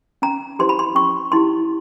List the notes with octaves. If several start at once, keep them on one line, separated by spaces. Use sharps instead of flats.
C#4 A#5
E4 G4 C5 C6
B5
C6
C#4 C#6
E4 G4 C6